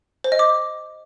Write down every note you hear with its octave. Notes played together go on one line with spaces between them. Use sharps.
C5
D#5
D6